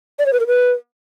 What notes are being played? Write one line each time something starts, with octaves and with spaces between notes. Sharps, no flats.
D5
C#5
B4
A#4
B4